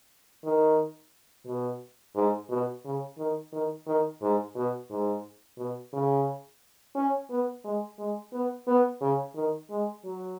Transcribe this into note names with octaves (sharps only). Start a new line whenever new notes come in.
D#3
B2
G#2
B2
C#3
D#3
D#3
D#3
G#2
B2
G#2
B2
C#3
C#4
B3
G#3
G#3
B3
B3
C#3
D#3
G#3
F#3